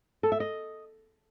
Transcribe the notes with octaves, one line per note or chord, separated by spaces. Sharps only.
A4
E5
D#5